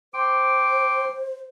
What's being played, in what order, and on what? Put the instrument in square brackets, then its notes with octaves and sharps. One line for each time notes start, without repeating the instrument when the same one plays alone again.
[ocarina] C5 [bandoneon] G5 C6 [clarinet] D6